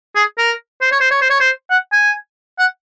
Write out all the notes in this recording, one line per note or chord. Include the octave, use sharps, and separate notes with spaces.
G#4
A#4
C5
C#5
C5
C#5
C5
C#5
C5
F#5
G#5
F#5